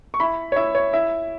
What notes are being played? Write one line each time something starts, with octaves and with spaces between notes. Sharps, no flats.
C#6
E4 B5
C#5
E4 E5
C#5
E4 E5